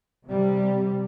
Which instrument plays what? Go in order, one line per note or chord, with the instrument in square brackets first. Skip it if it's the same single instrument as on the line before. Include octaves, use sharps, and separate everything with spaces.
[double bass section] C3 G3